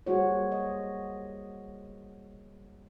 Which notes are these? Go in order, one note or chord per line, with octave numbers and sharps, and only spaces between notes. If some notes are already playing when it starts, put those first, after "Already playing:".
G3 A#3 F#4 G#4 C5 C#5
D#5